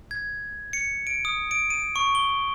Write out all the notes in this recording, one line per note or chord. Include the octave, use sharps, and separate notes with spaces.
G#6
C#7
D7
D#6
D7
D#7
C#6
G7